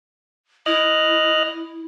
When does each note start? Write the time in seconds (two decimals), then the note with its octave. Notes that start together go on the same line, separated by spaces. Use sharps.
0.66 E4 D#5 F6 F#6